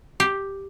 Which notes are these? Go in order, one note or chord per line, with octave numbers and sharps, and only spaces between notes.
G4